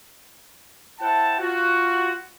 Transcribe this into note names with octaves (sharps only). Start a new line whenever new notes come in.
E4 C5 F#5 G5 A5
F4 F#4